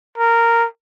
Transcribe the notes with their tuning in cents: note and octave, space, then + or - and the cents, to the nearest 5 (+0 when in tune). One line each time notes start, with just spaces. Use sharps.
A#4 -10